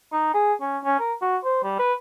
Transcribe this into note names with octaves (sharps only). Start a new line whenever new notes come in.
D#4
G#4
C#4
C#4
A#4
F#4
C5
G3
B4